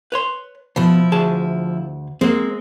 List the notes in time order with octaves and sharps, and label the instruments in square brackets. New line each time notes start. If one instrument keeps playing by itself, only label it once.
[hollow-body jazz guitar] B4 C#5 C6
[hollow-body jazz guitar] B2 [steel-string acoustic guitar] F3 E4
[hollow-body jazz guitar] D2 G#4 A5
[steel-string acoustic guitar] G#3 [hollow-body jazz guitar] A#3 C4